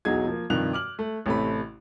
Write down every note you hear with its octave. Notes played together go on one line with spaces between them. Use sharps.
B1 E2 F#3 D#4 G#4 G#6
F3 A#3
G2 C3 D#3 F3 F#6 F7
D6 F6 F#7
A3
A1 C3 A3 C4 B5